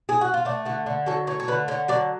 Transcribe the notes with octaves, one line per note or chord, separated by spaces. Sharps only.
G#4
F#4
F4
A3 D4
D3 F#4
D3
F#3 A4
A3 C#5
C#5
D3 B4
D3 C#5
F#3 D5